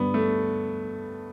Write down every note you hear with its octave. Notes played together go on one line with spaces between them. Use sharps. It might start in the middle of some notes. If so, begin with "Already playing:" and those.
Already playing: G2 D3 B3
A3